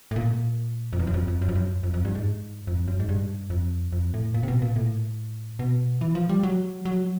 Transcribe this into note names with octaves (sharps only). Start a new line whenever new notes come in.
A2
A#2
F2
E2
F#2
F2
F2
F#2
F2
F#2
F2
F2
G2
G#2
F2
F#2
G#2
G2
F2
F2
A2
A#2
C3
B2
A#2
A2
B2
E3
F3
G3
F#3
F#3